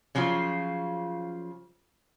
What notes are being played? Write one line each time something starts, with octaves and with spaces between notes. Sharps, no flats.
C#3 F3 F#3 C#4 F4